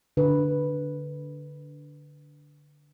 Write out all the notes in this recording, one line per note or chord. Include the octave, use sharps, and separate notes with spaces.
D3 B4